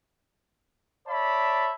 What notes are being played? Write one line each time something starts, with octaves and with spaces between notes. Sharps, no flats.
C#5 D5 E5 A5 B5